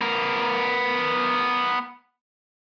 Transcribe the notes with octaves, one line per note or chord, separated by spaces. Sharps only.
B3 A#4